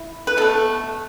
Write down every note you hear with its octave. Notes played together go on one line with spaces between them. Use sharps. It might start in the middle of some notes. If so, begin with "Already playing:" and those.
Already playing: E4
B4
B2 A3 A4